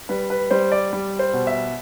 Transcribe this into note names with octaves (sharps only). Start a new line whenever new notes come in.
G3 B4
B4
G3 C5
D5
G3
C5
B2
E5